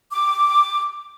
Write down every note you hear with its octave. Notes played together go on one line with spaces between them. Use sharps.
D6